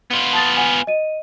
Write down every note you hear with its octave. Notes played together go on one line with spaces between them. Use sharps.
B3 F4
A5 D#6 A6
F#5 G#5
D#5 D#7